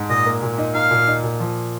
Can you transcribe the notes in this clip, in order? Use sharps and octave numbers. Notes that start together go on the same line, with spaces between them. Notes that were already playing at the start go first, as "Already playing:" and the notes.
Already playing: G#2
A#2 D#5
A#3
A#2
D#4
D#4 F5
A#2
D#4
A#2
F3